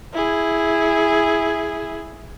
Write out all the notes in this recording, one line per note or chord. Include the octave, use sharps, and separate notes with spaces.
E4 G#4